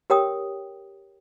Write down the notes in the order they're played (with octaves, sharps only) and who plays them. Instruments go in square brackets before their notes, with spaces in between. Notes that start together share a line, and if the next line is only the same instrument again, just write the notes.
[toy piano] G4 A#4 C#5 G5 D#6